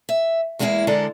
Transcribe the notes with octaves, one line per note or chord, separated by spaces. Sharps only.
E5
E2 G#3 A#3 C#4 E4 G#4
D3 G#3 D4 A4 A#4